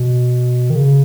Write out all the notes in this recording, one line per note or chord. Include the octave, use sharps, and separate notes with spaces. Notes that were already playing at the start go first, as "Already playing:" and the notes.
Already playing: B2
D#3
C#3